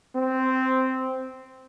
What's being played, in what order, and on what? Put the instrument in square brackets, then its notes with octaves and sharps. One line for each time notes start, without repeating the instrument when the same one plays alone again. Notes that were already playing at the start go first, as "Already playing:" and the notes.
[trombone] C4